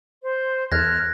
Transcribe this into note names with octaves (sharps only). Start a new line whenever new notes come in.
C5
E2 A4 E5 F6 F#6 G#6 A#6